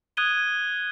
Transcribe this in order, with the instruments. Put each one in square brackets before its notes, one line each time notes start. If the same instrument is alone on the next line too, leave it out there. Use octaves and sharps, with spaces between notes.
[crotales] D#6 F#6 G#6 D#7 G7